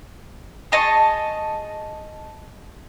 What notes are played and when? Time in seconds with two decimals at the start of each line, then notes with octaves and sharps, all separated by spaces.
0.72 G#4 D#5 A5 C#6